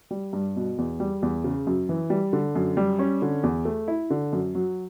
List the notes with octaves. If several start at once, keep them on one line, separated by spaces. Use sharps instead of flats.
G3
G2
B2
E2
G3
E2
C#3
F#2
E3
G3
D3
F#2
G3
C#4
D3
E2
A3
E4
D3
F#2
F#3